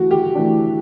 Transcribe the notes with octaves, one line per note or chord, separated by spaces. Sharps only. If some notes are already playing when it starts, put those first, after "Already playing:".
Already playing: E3 A3 F#4
G4
E3 A3 D4